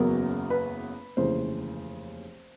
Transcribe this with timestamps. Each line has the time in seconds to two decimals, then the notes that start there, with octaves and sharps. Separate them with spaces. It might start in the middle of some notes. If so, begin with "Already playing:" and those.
Already playing: F#1 E2 C#3 F#3 B3 A#4
0.50 B4
1.17 F1 D#2 C#3 E3 C5